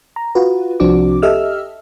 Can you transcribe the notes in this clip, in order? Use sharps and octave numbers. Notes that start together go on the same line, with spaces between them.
A#5
F4 F#4 B4
C2 F3 C4 D4 F#4 D6
G4 A4 D#5 E5 E6 F6